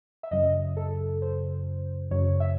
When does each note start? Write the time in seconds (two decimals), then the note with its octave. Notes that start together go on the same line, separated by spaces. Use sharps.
0.23 E5
0.31 F#2 C#3 F#3 D#5
0.77 A4
1.22 C5
2.11 F#2 C#3 F#3 C#5
2.40 E5